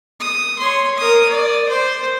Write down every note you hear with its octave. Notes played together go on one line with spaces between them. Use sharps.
D#6
C#5 C6
A#4 D#6
D5
C5